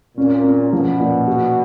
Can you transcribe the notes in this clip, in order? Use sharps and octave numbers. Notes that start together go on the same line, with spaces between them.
A#2 C#4
C#4
B2 F3
A#2
F#4